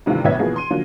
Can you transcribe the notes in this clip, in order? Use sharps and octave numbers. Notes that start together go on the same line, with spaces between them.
G2 C3 D#3 E3 A3 F4
B1 A2 B3 E5 G#6
B2 E3 F3 A#3 B3 G#4
C6 D#7
D3 F3 F#3 A#3